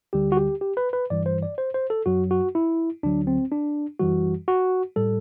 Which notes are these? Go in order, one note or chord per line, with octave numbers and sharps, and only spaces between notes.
D2 D3 G3 G4
F#4
G4
G4
B4
B4
G2 E3 G3 D5
C5
D5
C5
C5
A4
F#2 F#3 F#4
F#4
E4
D2 D3 F#3 D4
C4
D4
F#2 E3 G3 F#4
F#4
A2 G3 A4